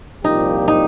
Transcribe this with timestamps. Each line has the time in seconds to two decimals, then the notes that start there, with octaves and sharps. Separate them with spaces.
0.24 C2 A#2 F3 A#3 D#4 G4
0.68 D#4